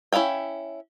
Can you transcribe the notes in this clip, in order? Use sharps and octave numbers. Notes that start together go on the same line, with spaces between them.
C#4 E4 D#5 F5 G5